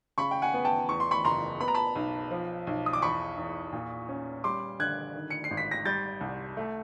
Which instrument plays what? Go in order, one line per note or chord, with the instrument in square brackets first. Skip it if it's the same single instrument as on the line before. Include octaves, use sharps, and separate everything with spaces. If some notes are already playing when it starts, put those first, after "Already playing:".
[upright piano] C#3 B5 C#6
G5
F#5 G#5
B3
G5 A5
E2 C#6
C6
B5 C#6
F#1 A#5 C6
B3 B5
A#5
A5 B5
B1
F3
B1
D#6
D6
E2 B5 C#6
E2
A#2
C#4
G3 C6 D6
D3 F#6 G#6
D#3
C#7
C7
G#1
B6
A#6
G3 G6 A6
C2
A3